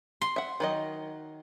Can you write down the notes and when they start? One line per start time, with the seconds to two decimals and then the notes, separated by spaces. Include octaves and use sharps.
0.21 C6
0.36 E5 F#5
0.60 D#3 F#3 D#5